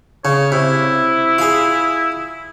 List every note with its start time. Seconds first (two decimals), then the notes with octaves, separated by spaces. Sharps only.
0.25 C#3 C#5
0.52 C3 E4
1.38 F4 G#4